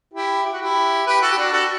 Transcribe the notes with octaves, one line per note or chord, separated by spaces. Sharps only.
E4 G4
G4
F#4
E4 G4
G4 B4
F#4 A4
G4
D4 F#4
F#4 A4